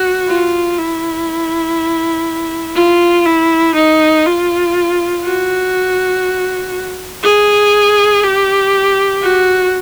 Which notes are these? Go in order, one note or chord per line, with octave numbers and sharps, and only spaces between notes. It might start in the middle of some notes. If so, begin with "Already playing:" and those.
Already playing: F#4
F4
E4
F4
E4
D#4
F4
F#4
G#4
G4
F#4